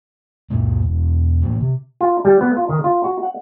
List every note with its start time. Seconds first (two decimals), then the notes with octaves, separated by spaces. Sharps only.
0.50 C#2 F#2 A#2 A#3
0.82 E1
1.42 A2 E3 A#3
1.61 C3
2.01 F4
2.25 G3
2.41 B3
2.57 F4
2.69 D#3
2.84 F4
3.04 F#4
3.23 F#5